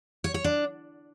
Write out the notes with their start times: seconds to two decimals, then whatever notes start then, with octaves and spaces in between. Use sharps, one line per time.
0.24 C#5
0.34 C#5
0.44 D4